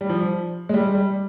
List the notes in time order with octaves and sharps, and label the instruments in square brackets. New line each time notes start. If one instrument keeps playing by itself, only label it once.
[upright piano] G3
F3
G#3
G3
G3